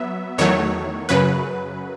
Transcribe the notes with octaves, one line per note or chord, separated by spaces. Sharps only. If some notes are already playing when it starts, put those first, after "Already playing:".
Already playing: F#3 B3 E5
E2 D#3 F#3 A3 C#5
F#2 C#3 F#3 B4